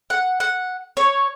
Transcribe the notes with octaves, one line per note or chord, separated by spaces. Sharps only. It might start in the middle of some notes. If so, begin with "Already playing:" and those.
F#5
F#5
C#5